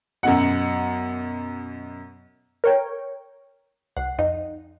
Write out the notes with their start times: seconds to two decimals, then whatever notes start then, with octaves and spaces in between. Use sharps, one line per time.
0.23 F#2 B2 F#5
2.64 A#4 C#5 G5
3.97 C2 F#5 C7
4.19 F2 D#4